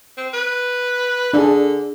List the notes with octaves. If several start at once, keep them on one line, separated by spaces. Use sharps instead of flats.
C4
B4
D3 D4 G#4